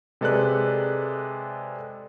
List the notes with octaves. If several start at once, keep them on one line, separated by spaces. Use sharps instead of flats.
C3 G#3 A4 B4 D5 F#6